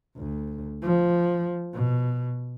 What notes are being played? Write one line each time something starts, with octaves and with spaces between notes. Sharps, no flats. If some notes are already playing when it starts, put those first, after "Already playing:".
D2
F3
B2